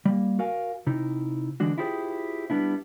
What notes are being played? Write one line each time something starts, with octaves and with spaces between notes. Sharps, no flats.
G3 A#3
F#4 A#4 F5 G#5
C3 D#4 E4
D3 E3 G#3 D4 F#4
E4 F4 G4 G#4 C5
G3 B3 D4 E4